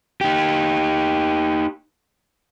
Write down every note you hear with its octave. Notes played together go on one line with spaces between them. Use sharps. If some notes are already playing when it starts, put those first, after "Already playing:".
D#4 G4